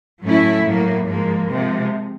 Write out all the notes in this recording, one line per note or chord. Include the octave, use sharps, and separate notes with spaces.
A2 F#3 A3 C#4 E4
A2 F#3 A#3
G#2 F3 A#3
C3 F3 G#3